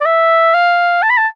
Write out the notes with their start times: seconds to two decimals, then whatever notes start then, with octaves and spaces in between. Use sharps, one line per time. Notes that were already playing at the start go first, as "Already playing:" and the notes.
0.01 D5
0.06 E5
0.54 F5
1.03 A5
1.10 B5
1.18 A5